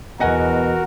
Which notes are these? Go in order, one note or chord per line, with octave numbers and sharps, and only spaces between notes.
E2 B2 F#4 A#4 D#5 F#5 G#5